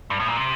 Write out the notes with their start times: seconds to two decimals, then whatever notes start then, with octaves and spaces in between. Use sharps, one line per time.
0.10 G2
0.20 A2
0.28 A#2
0.37 C3